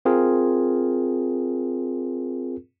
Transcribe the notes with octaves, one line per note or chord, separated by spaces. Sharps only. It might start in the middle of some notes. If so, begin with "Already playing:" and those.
C4 F4 G#4 A#4